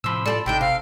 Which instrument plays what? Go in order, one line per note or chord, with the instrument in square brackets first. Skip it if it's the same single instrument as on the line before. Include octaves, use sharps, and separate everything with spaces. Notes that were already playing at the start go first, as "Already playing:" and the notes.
[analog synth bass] A2 [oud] C3 F3 [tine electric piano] B5 C6 E6
[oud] F4 G4 A4 [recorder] D5
[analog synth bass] G#1 [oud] C3 D4 D#4 [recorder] G5
[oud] C3 [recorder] F5